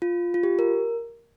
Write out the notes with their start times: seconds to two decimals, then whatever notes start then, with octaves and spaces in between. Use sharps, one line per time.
0.02 F4
0.34 F4
0.43 G4
0.59 A#4